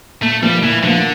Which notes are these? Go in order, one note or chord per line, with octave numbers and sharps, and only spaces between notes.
A#2 A3
F3 G3 A#3
A#2 E3
D3 F3 A#3